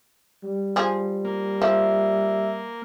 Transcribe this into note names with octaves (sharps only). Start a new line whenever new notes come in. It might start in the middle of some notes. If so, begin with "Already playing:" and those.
G3
F3 G#4
A#3
F3 E5 E6